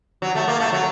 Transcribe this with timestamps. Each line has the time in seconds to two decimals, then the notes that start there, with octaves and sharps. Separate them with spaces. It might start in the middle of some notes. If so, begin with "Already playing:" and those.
0.22 F#3
0.35 A3
0.48 A#3
0.60 A3
0.73 F#3